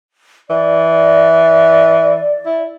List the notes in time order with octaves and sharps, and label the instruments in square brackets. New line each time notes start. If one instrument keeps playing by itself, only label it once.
[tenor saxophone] E3 [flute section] D5
[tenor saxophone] E4